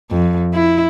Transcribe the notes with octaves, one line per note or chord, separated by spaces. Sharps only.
F2
E4